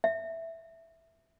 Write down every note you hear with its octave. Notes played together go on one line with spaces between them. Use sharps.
E5